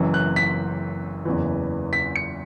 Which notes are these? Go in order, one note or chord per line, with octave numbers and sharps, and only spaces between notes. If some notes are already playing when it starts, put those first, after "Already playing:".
Already playing: F#1 F#2 E3
F#6
B6
F#1 E2 E3
B6
C#7